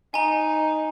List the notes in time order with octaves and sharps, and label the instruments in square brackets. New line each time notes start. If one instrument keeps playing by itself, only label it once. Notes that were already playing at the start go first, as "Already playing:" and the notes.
[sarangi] D#4 [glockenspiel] G#5 A#5